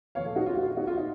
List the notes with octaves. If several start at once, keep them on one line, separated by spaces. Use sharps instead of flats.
A#2 F3 C#5 F5
A4
D#4 F#4
F4
F#4
F4
D#4 F#4
F4
D#4